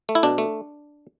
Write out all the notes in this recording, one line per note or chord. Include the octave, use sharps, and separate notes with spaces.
A3
E4
B2 D4
A3